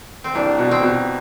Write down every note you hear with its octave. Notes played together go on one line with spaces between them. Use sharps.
C4
C2 D4
B2
C4
B2